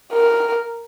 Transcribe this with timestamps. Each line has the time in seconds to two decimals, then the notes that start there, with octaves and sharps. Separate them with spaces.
0.13 A#4